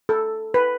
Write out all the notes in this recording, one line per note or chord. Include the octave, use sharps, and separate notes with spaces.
A4
B4